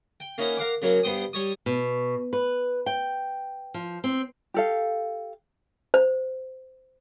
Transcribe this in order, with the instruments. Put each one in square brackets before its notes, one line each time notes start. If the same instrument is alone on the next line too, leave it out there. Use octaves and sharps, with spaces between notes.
[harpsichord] G5
A#3 C#4 D#4 E4 F#5
A#4 F5 F#5 D6
C#3 F#3 A#3
G2 B3 C5 G5 D#6
G3 C#5 D#6
[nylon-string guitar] B2
B4
G5
F3
C4
[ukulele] G4 A4 F5
[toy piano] C5